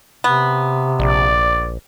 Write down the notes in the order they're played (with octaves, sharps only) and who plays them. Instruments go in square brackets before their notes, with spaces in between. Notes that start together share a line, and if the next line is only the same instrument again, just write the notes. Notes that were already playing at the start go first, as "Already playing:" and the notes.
[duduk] C3 [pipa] B3
[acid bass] A#1 [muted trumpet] D5